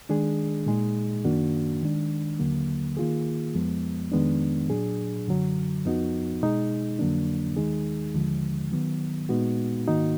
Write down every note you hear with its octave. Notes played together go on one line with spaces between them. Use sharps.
D#3 G#3 D4 G#4
A#2 G#3 D#4 G#4
F#2 D#3 A#3 D4 F#4
D#3 G#3 D4
D#2 D3 F#3 A#3
D#3 A#3 F4 G#4
F2 F3 G#3 B3
F2 D#3 G#3 B3 D4
A#2 F#3 D4 G#4
F#2 D3 F#3
F2 F3 B3 D#4 F#4
B2 G#3 D#4 G#4
F2 D3 F#3 A#3 D4
D#2 D#3 G#3 D#4 G#4
D#2 D3 F3 G#3
D#3 F#3 B3
A#2 G#3 B3 D#4 F#4
G#2 D#3 A#3 D#4 F#4